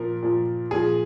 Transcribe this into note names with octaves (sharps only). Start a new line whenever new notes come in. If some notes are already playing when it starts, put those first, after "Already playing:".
Already playing: A#2 F3 A#4
A#2 F3
A#2 F3 G#4